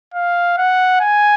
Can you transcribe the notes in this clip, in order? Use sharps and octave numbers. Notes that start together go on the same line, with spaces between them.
F5
F#5
G#5